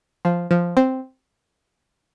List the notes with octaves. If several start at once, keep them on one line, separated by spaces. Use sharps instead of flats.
F3
F3
C4